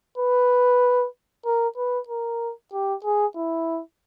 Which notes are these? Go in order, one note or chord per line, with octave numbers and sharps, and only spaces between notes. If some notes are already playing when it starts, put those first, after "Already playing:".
B4
A#4
B4
A#4
G4
G#4
E4